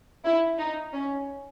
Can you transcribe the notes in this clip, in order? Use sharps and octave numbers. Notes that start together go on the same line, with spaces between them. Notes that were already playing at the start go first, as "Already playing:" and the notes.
E4
D#4
C#4